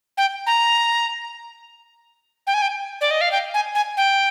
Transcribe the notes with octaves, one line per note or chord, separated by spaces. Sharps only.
G5
A#5
G5
G#5
G5
D5
D#5
F5
G5
G#5
G#5
G5